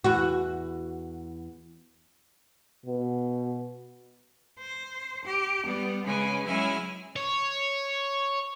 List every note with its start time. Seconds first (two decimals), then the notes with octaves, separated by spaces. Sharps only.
0.04 E2 F#4
2.86 B2
4.58 C5
5.23 G4
5.64 G3 B3
6.03 C#3 G#3 C#4 B4 G#5
6.44 F#3 G#3 C#4 E4 G#5 F6
7.16 C#5